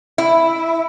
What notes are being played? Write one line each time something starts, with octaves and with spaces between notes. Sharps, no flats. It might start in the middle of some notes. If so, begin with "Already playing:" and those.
E4